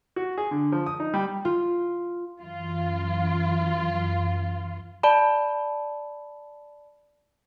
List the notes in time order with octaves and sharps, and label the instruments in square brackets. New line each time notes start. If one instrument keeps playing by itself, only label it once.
[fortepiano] F#4
G#4
D3
F3
D#6
D#4
G3
[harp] F4
[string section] F#2 E3 F4
[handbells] D5 A5 B5